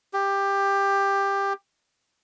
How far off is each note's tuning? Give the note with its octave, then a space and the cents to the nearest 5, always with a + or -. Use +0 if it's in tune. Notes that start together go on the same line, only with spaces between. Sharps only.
G4 +15